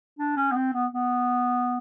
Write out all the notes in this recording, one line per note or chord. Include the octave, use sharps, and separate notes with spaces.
D4
C#4
B3
C4
B3
B3